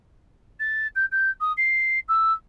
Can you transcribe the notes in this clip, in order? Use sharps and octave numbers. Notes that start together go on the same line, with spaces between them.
A6
G6
G6
D#6
C7
E6